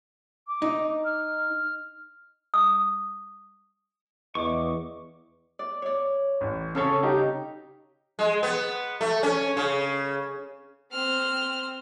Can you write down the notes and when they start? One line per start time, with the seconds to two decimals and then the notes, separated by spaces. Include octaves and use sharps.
0.47 D6
0.62 D#4
1.05 F6
2.54 D#6
4.35 E2 D#5 C#6 D6
5.59 D5
5.82 C#5 D5
6.41 A1
6.75 C#3 C#4 A4 C#5
7.03 D#4 G4
8.19 G#3
8.43 B3
9.01 A3
9.23 C#4
9.57 C#3
10.92 C4 F6